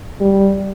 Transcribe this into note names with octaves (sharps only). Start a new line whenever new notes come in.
G3